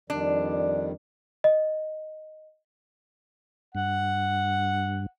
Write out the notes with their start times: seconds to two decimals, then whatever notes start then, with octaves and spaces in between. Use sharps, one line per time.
0.10 F2 D#3 G3 D4
1.44 D#5
3.75 G2 F#5